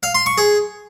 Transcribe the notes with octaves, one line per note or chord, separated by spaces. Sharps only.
F5
C6
C#6
G#4